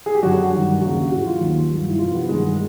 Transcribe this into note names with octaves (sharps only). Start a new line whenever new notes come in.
G#4
G4
F#2 D3 F#3 F#4
G2 D#3 F#3
D#2 C#3 F#3 F#4
G#2 E3 F#4
F4
D#2 D#3 F#3
G2 D#3 F#3
E4
F2 C3 E3 F4
B3
G2 D#3 F#3 G#3